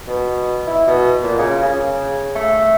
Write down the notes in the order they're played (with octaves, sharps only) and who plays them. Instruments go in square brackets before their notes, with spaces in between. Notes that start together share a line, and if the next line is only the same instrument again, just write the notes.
[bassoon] B2
E4
B2
A#2
C#3
C#3
A3